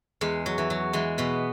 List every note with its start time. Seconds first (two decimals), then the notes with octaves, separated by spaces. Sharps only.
0.21 E2 G#3
0.46 F#3
0.58 E3
0.70 F#3
0.93 E3 G#3
1.18 B2 B3